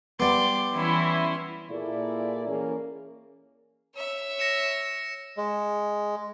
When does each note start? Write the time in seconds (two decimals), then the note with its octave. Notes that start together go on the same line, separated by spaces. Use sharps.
0.20 G3 B3 C6 D6
0.73 E3 C#4 E4 C6
1.70 A#2 A#3 E4 G#4 A4 D5
2.47 E3 A#3 C#4 G#4 A#4
3.95 C#5 E5
4.39 A#6 C#7 E7
5.37 G#3